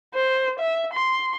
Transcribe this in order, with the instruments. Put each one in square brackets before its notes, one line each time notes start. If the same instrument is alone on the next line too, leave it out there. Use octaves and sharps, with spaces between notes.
[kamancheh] C5
E5
C6